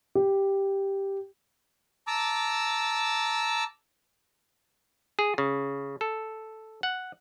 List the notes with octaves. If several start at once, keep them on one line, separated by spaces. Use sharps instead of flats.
G4
A5 A#5 D6 E6
G#4
C#3
A4
F#5